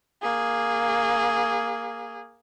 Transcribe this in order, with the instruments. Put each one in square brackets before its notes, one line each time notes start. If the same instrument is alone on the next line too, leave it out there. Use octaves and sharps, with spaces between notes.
[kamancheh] A#3 G#4